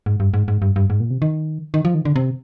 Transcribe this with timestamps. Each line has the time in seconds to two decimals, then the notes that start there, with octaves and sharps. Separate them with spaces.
0.06 G#2
0.20 G2
0.34 G#2
0.48 G#2
0.62 G2
0.76 G2
0.90 G#2
1.00 A#2
1.11 C3
1.22 D#3
1.74 D#3
1.85 F3
1.94 D#3
2.05 D3
2.16 C3